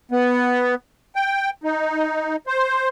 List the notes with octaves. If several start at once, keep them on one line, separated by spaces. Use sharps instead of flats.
B3
G5
D#4
C5